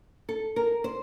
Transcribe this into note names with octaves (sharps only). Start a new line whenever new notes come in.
A4
A#4
C5